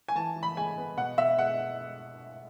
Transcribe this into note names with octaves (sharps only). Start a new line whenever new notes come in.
G#5
E3 A5
E3
B5
G#3 G#5
B3
B2 F#5
B2 E5
G#3 F#5